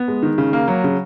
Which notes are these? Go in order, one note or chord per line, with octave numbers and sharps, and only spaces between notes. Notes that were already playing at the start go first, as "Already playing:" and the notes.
Already playing: B3
G#3
D#3
C#3
A#3
F#3
C#3